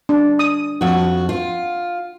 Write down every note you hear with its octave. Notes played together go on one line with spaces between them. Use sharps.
D4
D#6
F2 F#4
F4